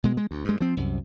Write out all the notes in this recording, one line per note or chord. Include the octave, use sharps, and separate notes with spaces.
B2 G#3
G#3
D2
G2 G#3
F3 C4
C2 F#2